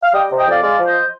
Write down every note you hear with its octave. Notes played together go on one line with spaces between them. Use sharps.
F5
G3 D#5 G5
C3
D#5 G5
F2 D5 F5
G#3 D5 F5
F3
C5 D#5